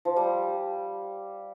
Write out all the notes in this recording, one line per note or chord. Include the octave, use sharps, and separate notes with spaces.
F3
G3